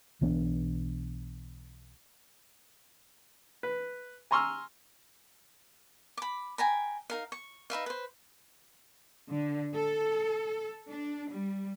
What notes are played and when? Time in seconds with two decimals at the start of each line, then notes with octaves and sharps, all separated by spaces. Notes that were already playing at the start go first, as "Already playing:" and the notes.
0.21 B1 E3 B3 D4
3.63 B4
4.31 G#5 A#5 C6 C#6 E6 F6
6.17 B5 D6
6.58 G5 G#5 A#5 B5
7.10 D#4 A#4 F5
7.32 C#6
7.70 D#4 B4 E5 F5
7.86 B4 C5
9.30 D3
9.75 A4
10.90 D4
11.31 G3